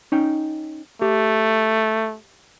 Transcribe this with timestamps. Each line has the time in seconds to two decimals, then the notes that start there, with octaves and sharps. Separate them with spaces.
0.12 C#4 D#4 G5
1.02 A3 G4